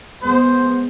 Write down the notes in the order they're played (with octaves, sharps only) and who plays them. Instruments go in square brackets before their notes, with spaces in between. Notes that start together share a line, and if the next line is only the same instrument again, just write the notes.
[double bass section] G#3 B3 [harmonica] C5